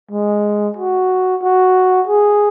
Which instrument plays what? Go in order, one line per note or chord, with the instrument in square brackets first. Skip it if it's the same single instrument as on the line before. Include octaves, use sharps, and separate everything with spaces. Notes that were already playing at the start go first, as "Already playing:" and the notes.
[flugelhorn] G#3
F#4
F#4
G#4